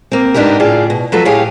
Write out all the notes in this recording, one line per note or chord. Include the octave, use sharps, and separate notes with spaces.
A#3 C4
G#2 B3 D4 D#4 G4 A#4
A2 C#3 F4 G4 G#4 D5
B2
F3 F#3 F#4 A4 B4
A2 G4 G#4 C#5 F5 G5